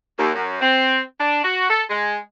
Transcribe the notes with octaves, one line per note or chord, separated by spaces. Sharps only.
D#2
F#2
C4
D4
F#4
A4
G#3